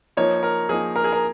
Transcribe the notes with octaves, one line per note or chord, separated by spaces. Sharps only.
F3 A#3 D#4 C#5
A#4
F3 A#3 D#4 G#4
A#4
G#4
A#4